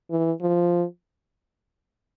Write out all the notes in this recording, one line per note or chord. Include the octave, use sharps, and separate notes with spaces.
E3
F3